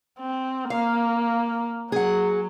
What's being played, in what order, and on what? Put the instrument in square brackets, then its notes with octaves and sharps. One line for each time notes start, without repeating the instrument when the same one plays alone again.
[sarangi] C4
[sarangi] A#3 [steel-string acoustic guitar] F5
[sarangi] F#3 [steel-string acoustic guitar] G#4 F#5